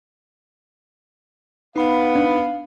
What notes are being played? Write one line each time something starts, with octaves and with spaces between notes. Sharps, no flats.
B3 D#4 F5 B5
D4